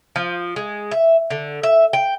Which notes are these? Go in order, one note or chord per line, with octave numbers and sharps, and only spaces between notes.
F3
G#3
E5
D3
E5
G5